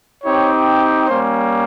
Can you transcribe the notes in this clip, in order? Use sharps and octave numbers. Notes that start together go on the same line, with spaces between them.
C4 D#4 G4 C#5
G3 A#3 C#4 C5